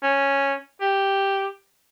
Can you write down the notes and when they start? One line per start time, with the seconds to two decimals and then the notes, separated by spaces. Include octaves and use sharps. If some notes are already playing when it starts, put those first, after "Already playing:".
0.03 C#4
0.81 G4